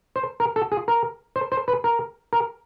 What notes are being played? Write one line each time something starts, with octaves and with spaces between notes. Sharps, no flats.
C5
A#4
A4
G#4
A#4
C5
C5
B4
A#4
A#4